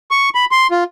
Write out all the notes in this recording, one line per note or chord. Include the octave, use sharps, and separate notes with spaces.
C#6
B5
C6
F4